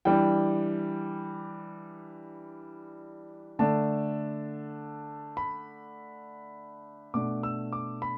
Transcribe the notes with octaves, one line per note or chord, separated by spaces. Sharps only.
E3 G3 D4 G5
D3 A3 D4 A5
B5
B2 A3 D4 D6
E6
D6
B5